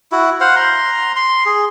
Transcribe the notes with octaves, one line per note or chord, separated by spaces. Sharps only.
E4 F#4
C5 F5 F#5
A#5 C6
C6
G#4